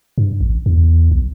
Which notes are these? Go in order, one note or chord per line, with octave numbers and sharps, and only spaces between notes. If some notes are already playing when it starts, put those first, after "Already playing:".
G2
A1
E2
B1